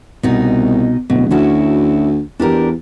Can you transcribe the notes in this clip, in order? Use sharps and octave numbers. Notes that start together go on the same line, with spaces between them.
C2 B2 D#4
D1 B2
D2 C#4 E4 F#4
E2 D4 G4 A#4